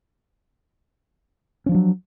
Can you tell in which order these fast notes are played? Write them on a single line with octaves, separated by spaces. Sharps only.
C#4 F3 D4 F#3